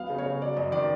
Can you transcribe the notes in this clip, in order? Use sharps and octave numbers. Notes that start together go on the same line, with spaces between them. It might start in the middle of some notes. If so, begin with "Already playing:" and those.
Already playing: F#3 B3 F5
C#3
C#5
C#3
F#3 D5
F#2 D#5
D#3 D5